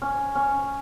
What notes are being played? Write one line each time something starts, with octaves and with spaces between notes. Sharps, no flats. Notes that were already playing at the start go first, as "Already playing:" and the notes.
C#4
C#4